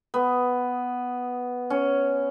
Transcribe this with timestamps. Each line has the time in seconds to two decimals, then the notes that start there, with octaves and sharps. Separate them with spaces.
0.14 B3
1.70 C#4